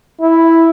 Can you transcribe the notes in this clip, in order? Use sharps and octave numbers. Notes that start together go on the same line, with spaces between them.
E4